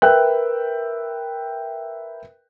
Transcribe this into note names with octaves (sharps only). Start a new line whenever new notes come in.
A#4 B4 E5 G5 F#6